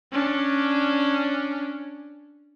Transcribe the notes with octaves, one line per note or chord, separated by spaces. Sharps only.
C#4 D4